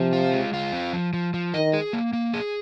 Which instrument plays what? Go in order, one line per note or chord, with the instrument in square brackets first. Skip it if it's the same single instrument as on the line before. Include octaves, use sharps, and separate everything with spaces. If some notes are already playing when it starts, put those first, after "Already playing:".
Already playing: [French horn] C3 [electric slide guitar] F3
[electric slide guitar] F4
G#3
F4
C4
F3
F3
F3
[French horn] D#3 [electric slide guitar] D#5
[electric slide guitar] G#4
A#3
A#3
G#4